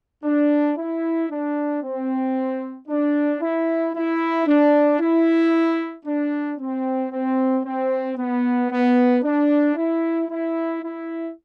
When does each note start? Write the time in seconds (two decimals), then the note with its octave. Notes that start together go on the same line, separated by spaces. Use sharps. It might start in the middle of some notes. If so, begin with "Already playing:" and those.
0.24 D4
0.77 E4
1.30 D4
1.83 C4
2.88 D4
3.41 E4
3.94 E4
4.47 D4
5.00 E4
6.06 D4
6.59 C4
7.12 C4
7.65 C4
8.17 B3
8.70 B3
9.23 D4
9.76 E4
10.29 E4
10.82 E4